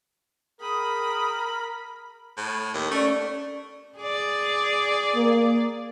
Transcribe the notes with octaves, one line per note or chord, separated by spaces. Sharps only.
G#4 A#4 G5 B5 D#6
A2
D#2
A3 C#4 D5
G#4 D5
A#3